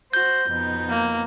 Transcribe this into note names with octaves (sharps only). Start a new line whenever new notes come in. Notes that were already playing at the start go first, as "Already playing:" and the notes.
F#4 C5 G6
F2 B2 D#4
A#3